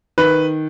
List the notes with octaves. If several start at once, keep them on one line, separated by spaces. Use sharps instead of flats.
D#3 B4